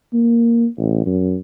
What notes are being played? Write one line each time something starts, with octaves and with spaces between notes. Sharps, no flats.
A#3
A1
F#2